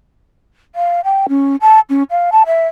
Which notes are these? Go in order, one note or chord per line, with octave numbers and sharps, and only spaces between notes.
F5
G5
C#4
A5
C#4
F5
A5
E5